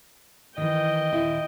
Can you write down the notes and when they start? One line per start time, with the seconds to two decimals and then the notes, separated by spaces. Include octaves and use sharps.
0.58 D#3 E3 D#5 G5
1.13 D#2 A#2 E4